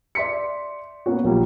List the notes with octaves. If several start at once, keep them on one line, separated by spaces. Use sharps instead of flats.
D5 E5 C6 B6 C#7
A#3 B3 C#4 F#4
A#1 F#3 G3 A#3